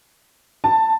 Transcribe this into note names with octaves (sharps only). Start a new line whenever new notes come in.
A5